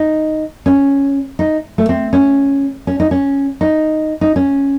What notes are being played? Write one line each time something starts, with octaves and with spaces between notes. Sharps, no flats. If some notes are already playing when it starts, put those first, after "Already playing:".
Already playing: D#4
C#4
D#4
A3
C4
C#4
C#4
D#4
C#4
D#4
D#4
C#4